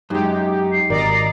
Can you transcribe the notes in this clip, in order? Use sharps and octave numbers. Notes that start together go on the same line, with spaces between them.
F#2 G#3 D#4 G4
C7
G#1 A#4 D5 D#5 A#5